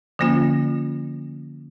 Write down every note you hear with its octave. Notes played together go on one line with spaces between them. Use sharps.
D3 F3 A#3 C#4 F4